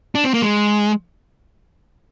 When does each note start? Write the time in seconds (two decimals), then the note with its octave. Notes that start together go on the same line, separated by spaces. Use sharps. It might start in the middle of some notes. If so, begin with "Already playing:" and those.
0.15 D4
0.25 C4
0.34 A#3
0.42 G#3